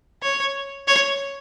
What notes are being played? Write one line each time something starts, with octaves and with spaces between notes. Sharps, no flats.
C#5
C#5